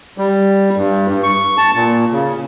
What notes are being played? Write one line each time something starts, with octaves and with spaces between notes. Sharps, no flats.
G3
G2
G2
C#6
A5
A#2
C#3